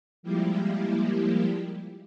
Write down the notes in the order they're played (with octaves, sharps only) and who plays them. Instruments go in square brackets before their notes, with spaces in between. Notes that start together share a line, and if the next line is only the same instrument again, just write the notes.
[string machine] F3 G3 G#3 A#3 E4 G4